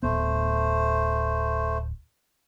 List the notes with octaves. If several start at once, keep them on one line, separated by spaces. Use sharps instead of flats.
D1 A3 B3 C5